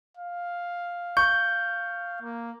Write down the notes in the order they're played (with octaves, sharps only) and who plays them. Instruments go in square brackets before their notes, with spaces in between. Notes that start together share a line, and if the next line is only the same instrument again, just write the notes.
[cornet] F5
[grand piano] C#6 [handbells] G6
[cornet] A#3